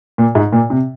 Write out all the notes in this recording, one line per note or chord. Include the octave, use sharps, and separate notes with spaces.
A#2
G#2
A#2
C3